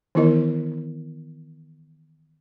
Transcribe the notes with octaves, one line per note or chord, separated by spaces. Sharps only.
D#3 E3 B3 E4 A#4 D#5